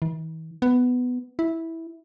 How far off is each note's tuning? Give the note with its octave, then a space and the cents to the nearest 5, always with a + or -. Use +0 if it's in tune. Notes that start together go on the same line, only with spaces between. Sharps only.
E3 -45
B3 +10
E4 -10